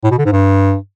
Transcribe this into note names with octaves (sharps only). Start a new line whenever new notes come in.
A2
B2
D3
G#2
G2